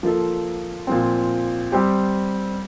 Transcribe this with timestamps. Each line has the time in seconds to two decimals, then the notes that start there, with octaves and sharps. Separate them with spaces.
0.03 F3 A#3 F4 A4
0.87 A#2 F3 C4
1.72 G3 C4 G4